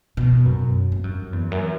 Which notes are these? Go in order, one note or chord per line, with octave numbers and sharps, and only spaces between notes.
B2
F#2
G2
F#2
E2
F#2